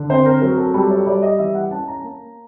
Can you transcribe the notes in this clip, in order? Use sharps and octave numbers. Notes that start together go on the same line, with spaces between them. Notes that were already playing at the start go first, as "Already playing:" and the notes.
Already playing: D3
C4 C5
A#4
F#3 A#4
A4
G3 A4
C#5
G3 D5
D#5
E3 E5
F#5
C#4 A5
A#5
A#3